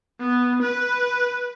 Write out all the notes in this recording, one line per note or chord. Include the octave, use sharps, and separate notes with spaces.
B3
B4